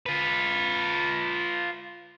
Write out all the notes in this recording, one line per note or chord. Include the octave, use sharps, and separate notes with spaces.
F4 B4